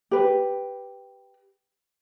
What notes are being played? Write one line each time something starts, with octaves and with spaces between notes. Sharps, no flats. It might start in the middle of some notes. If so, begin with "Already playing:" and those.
G4 B4